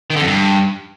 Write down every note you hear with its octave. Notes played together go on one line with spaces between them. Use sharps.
D#3
D3
F2
G2